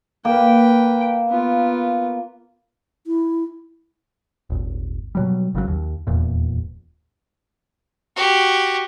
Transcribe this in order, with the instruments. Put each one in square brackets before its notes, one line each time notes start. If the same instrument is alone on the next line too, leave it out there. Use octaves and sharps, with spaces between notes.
[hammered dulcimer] A#3 [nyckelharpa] B4 G5
[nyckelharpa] B3 F4
[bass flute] E4
[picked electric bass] D#1 G#1
B2 F#3 G3
G#1 C#3 E3 F#3
D#2
D#1 E2 A#2
[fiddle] F#4 G4